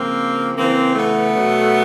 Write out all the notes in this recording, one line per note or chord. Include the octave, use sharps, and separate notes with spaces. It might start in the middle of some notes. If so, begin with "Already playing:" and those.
Already playing: C#3 F3 A#3 C4
C#3 E3 A#3 C4
A3 B3
B2 F#3